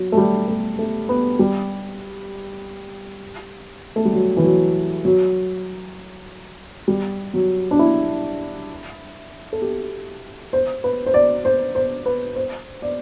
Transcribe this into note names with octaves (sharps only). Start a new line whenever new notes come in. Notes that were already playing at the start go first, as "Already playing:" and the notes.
Already playing: F#3
A3
G3
A3
A3
B3
G3
A3
G3
F#3
E3
F#3
F#3
G3
F#3
D4
E4
A4
G4
C5
B4
C5
D5
C5
C5
B4
C5
D5